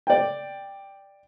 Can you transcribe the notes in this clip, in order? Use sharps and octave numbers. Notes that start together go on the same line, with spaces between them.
D5 G5